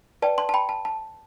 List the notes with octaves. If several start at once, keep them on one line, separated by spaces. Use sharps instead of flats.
B4 D5 G5 A5
A5 C6
A5
G5 B5
A5
A5